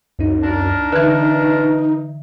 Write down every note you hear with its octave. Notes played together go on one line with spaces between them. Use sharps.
C#2 F#2 D#4
A#2 D4 A#4
D3 E3 D#4 B4